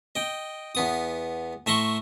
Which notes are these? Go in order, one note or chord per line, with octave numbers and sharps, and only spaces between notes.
D#5 G5
E2 B3 D#6
A2 E5 A#5 C6 C#6